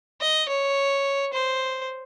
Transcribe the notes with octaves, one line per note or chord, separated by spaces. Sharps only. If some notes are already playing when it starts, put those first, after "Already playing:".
D#5
C#5
C5